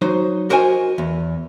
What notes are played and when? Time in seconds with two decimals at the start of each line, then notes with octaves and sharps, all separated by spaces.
0.02 F#3 D#4 C5
0.50 F#4 A#4 C5 D#5 G#5
0.98 E2